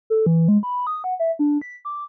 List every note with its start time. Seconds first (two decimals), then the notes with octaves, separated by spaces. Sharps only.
0.10 A4
0.26 E3
0.48 G#3
0.63 B5
0.87 D#6
1.04 F#5
1.19 E5
1.39 D4
1.62 B6
1.85 D6